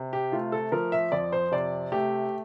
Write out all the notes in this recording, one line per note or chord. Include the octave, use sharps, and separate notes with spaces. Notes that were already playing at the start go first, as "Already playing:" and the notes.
Already playing: C3
G4
A3 F4
A4
F3 A#4
E5
F2 D5
C5
C3 D5
A3 G4